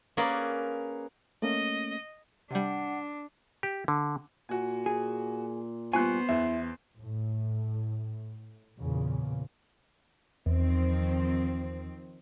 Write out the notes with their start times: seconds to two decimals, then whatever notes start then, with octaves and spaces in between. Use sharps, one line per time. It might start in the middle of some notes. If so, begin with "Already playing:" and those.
0.17 A#3 C#4 G#4 A#4 B4 D5
1.42 A3 A#3 C#4 D#5
2.51 C3 G3 D4 F#5
3.63 G4
3.88 D3
4.49 A#2 F#4 G#5
4.86 G#4
5.93 G2 B3 F4 C5 G#5 C#6 F#6
6.29 E2 E3 E5
6.97 A2
8.80 E2 A#2 C#3
10.46 E2 D#3 F3 C4